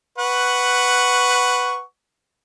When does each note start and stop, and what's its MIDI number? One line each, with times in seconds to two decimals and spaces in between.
0.18 1.81 71
0.18 1.81 78
0.18 1.81 85